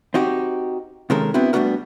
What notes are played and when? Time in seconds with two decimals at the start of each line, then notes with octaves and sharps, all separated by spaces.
0.14 C4 D#4 F#4 G4
1.10 C3 D#3 G#3 C#4 A4 A#4
1.34 B3 C4 D4 E4 F#4
1.53 G3 A3 B3 D4 F#4 A#4